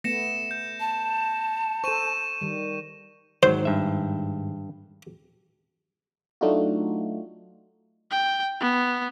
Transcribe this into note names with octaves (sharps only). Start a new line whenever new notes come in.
A3 B3 A#6 C#7 E7
G6
A5
A4 C5 C#6 D#7 E7
D#3 G3
G#2 D#3 F#3 C5
G2 E5
F#3 A3 D4 D#4 F4 F#4
G5
B3